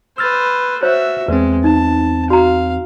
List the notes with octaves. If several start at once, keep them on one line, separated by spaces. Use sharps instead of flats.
B4 C5 E6 F6 A6
F#4 C5 C#5 E5
E2 G#3 C4 B4
D#4 A5
F#4 F5 A#5